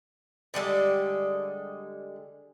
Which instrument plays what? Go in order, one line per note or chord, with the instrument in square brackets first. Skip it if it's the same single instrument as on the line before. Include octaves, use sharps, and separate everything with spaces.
[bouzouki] D3 G3 G#3 A4